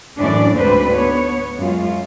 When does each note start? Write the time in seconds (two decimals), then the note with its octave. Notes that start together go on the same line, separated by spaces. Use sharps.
0.20 F#2 A2 E3 C#4 D4 D5
0.57 D2 G#2 C4 D4 B4 C5
0.94 B3 C#5
1.59 F#2 G#3 F4